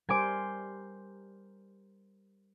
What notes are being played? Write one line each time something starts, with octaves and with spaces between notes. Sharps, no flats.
G3 A#4 C5 G#5 D6